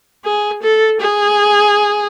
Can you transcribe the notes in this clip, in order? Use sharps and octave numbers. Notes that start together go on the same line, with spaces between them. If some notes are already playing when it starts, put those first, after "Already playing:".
G#4
A4
G#4